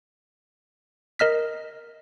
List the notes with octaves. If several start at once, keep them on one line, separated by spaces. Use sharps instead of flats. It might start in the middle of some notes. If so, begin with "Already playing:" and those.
A#4 D#5 F6 B6